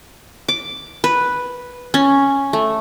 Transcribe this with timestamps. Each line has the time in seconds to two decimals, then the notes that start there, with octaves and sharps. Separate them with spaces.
0.48 D6
1.04 B4
1.94 C#4
2.53 A3